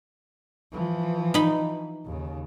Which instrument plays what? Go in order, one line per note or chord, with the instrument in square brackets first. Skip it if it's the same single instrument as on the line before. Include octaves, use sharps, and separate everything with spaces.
[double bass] E3 F3
[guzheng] D#4 B5
[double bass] D#2 C#3